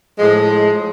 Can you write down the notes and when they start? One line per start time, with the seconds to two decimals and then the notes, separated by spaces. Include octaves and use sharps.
0.18 A2 F3 G#3